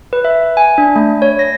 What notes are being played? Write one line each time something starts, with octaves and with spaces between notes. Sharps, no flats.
B4
E5
G#5
D4
A3
C#5
A#6